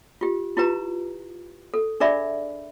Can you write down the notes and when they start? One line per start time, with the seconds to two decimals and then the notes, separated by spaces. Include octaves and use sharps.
0.21 F4 G4
0.57 E4 F4 G4 B4 A#5
1.74 A4
2.00 D4 G#4 A#4 D5 E5 B5